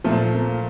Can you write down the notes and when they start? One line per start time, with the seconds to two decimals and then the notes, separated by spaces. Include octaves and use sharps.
0.04 A#2 F3 A3
0.34 A#3